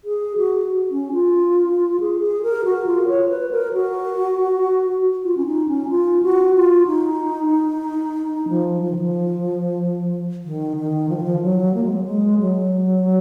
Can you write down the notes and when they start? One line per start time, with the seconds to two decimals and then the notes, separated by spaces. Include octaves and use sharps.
0.05 G#4
0.37 F#4
0.91 C#4
1.13 F4
2.00 G#4
2.21 G#4
2.43 A#4
2.65 F#4
2.86 F4
3.08 C#5
3.29 B4
3.51 A#4
3.73 F#4
5.24 F4
5.37 C#4
5.46 D#4
5.68 C#4
5.89 F4
6.23 F#4
6.55 F4
6.87 D#4
8.49 F3
8.82 F3
8.91 D#3
8.99 F3
10.44 D#3
10.77 D#3
11.09 F3
11.16 D#3
11.23 F3
11.42 F#3
11.74 A#3
11.84 G#3
11.94 F#3
12.04 G#3
12.40 F#3